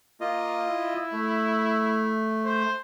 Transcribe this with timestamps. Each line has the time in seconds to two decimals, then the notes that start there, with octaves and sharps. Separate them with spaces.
0.21 A#3 F4 D#5
0.68 E4
1.12 A3
2.45 C5